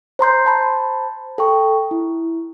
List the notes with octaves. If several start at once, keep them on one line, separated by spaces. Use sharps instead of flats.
C5 A#5 C6 G6
C5 A5 B5
A4 G5 C#6
E4